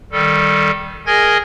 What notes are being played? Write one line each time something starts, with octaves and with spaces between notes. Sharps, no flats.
D#3 G3 A4
G#4 A#4 D#5 G#5 G#6 A#6